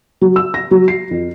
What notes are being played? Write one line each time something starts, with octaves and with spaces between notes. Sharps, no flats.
F#3
E6
A#6
F#3
C7
F2